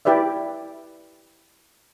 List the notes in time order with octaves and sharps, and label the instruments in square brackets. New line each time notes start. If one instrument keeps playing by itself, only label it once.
[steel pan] E4 G4 B4 D5 E5